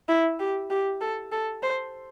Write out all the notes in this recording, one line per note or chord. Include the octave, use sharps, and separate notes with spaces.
E4
G4
G4
A4
A4
C5